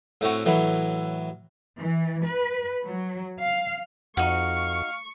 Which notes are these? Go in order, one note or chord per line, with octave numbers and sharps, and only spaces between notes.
A2 A3 C4 C#4 F#4
A2 E3 F#3 E4
E3
B4
F#3
F5
F2 D#4 F#4 F5 C#6